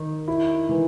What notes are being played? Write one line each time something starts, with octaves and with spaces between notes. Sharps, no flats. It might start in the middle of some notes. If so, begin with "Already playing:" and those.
Already playing: D#3 D#4
E4
E3